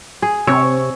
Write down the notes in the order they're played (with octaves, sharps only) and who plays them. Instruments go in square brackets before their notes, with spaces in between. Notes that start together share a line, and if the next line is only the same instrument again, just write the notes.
[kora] G#4
[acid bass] C3 [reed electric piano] C4 C#6 E6 [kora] C#5